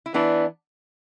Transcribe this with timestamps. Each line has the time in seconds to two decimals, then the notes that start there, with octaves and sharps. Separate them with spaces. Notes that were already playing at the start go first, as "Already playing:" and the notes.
0.06 E4
0.14 E3 B3 D4